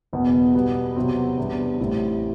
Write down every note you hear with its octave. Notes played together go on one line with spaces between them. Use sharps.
F#1 E2 B2
B2 G3 B3
E2 C3 F#3 C4
E2 C3 G3 D4
A1 A2 G3 C4